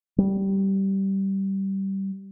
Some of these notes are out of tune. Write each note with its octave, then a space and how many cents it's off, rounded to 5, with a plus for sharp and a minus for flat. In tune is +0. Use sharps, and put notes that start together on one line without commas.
G3 -15